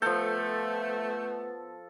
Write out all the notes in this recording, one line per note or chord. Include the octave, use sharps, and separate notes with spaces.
F3 A3 B3 A4 G6